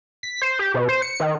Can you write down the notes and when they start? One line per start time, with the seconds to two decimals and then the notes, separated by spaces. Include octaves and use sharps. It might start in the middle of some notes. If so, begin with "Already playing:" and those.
0.23 B6
0.42 C5
0.59 G4
0.74 B2
0.89 C5
1.02 C#7
1.20 D#3